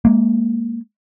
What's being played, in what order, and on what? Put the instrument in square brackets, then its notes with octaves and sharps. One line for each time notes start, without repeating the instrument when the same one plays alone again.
[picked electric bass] G#3 A#3